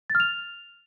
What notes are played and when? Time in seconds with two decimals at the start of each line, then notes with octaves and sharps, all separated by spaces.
0.10 A6
0.15 F6
0.20 F7